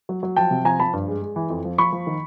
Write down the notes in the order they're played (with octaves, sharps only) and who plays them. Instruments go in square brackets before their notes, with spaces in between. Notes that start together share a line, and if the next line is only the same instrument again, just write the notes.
[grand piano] F#3
F#3
F3 G5 A5
C3
F3 G#5 A#5
F3 A5 B5
G2
G#3
G#3
E3
F2
F3
F3 B5 C#6
F3
D#3